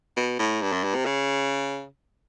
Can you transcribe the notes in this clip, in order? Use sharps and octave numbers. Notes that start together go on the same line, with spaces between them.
B2
A2
G2
F#2
G2
C3
C#3